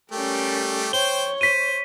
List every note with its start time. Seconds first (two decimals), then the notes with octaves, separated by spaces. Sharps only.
0.12 G3 A3 C#4 G4 A#4
0.93 C5 C#5 G5 G7
1.41 C5 B6 D#7